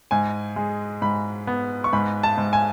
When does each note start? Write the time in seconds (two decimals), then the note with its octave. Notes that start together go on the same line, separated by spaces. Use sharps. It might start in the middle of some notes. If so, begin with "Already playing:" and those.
0.11 G#2 G#5
0.56 G#3
1.02 G#2 B5
1.47 B3
1.84 C#6
1.93 G#2 B5
2.23 A5
2.38 G#2
2.53 G#5